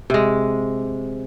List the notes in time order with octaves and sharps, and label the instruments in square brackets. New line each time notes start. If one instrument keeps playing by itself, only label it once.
[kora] C3 G#3